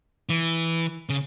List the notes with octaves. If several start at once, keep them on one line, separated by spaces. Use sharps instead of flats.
E3
C#3